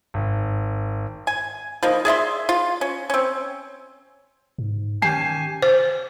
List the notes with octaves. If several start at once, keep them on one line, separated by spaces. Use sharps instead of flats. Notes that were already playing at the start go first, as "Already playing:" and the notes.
G#1
G#5
F3 A#3 D#4
G#4 D5 E5 C6
F4
C#4
C4 C#4
G#2
D#3 C#4 G4 G#5 A5 C7
C5